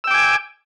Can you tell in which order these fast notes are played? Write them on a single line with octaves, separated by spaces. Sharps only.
E6 G5 D6 G#5